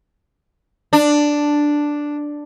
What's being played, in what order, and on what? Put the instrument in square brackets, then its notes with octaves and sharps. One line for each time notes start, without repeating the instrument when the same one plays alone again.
[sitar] D4